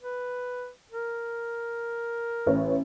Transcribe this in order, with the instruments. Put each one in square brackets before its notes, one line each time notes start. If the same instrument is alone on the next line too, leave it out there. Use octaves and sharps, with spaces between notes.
[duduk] B4
A#4
[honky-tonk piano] A1 B4 C#5